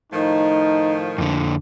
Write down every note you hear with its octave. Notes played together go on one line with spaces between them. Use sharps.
A2 D#3 F3 D#4
F2 D3